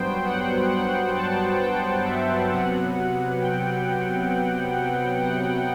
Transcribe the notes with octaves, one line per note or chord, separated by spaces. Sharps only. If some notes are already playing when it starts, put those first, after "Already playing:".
Already playing: G2 F#3 B3 C5 G5
F#5
F#5
A5
G5
E5
C3 F#3 B3 F#5
G5
F#5